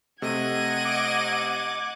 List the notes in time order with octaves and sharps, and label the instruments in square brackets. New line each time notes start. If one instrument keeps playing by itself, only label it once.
[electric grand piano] C3 A3 [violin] D#5 D#7 [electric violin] F#5 G#6
[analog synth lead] D6